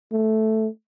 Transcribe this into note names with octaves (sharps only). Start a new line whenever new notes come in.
A3